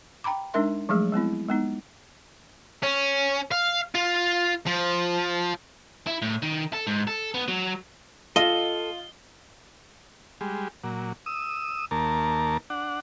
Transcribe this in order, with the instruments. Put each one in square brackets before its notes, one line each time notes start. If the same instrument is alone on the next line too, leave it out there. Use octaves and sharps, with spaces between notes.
[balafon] G5 A#5 B5 D6
G#3 D4 D#4 A#4 E5 C6
F3 F#3 G#3 A3 G#4
G#3 B3 C4 E4
G#3 B3 D#4
[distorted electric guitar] C#4
F5
F4
F3
[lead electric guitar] E4
A2
D#3
A4
G#2
A4
B3
F#3
[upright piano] F4 [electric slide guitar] A4 [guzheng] D#5 [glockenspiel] G7
[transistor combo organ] G3 G#3
A#2 F#3
D#6 E6
D#2 A#3 A#4 A5
D4 F#5